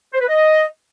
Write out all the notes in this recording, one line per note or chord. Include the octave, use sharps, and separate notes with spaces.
C5
B4
D#5